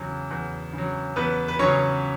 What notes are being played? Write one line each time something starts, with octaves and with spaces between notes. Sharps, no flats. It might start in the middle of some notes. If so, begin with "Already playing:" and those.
Already playing: E2 C#3 F#3
E2
C#3 F#3
E2 B3 B4
B4
C#3 F#3 C#4 C#5